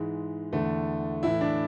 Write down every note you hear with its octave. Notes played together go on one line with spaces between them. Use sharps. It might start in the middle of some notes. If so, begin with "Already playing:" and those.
Already playing: G#2 E3 G#3
E2 D3 A3
A2 E3 E4
D4